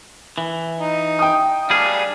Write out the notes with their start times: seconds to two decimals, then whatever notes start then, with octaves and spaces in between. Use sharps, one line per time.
0.38 E3
0.79 D#4
1.19 G5 D#6
1.70 G3 D4 G#4 F5